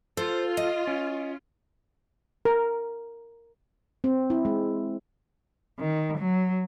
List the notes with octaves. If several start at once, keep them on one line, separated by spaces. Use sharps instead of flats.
F4 A4 C5
D#5
C#4
A#4
C4
E4
G#3
D#3
F#3